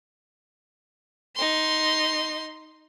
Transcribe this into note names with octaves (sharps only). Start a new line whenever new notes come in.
D#4 C6